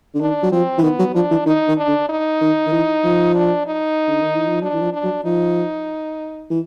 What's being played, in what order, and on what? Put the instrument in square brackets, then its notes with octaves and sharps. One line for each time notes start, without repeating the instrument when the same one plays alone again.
[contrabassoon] D3
[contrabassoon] D#3 [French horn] D4
[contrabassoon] F#3
[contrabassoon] F3 [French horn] C4
[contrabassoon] E3
[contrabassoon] D#3 [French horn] B3
[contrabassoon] F#3
[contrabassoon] F3 [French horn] D4
[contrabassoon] E3
[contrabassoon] D#3 [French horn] D#4
[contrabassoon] D#3
[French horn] D4
[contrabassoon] D3
[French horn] D#4
[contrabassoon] D#3
D#3
E3
F3
[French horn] D4
D#4
[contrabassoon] D3
D#3
E3
F3
[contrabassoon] F#3 [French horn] D4
[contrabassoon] E3
F3
[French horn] D4
[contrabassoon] F#3
[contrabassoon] F3 [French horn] D#4
[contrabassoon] E3